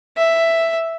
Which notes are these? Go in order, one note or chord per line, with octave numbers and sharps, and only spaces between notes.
E5